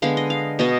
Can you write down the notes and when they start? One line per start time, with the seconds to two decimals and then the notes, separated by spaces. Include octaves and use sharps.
0.02 D3 G#3 B3 F5
0.17 D#5
0.30 F5
0.59 B2 B3 D#5